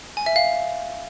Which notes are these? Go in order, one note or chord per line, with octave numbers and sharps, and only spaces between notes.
G#5
E5
F5